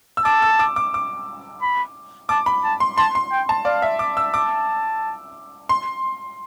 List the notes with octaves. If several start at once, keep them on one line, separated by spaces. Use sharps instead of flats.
E6
A5 D6
E6
D6
D6
D6
B5
A5 D6
B5
A5
C6
A5 C6
C6
G5
A5
D5 F5
E5
D6
E6
A5 D6
C6